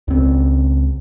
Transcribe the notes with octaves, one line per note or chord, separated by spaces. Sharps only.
C#2 C4